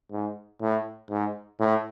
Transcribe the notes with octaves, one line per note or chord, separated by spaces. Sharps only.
G#2
A2
G#2
A2